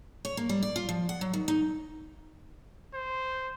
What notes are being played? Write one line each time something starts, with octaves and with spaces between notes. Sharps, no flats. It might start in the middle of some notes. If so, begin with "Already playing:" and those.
C#5
A#3
G3
D5
F4
F3
F#5
F#3
D#3
D#4
C5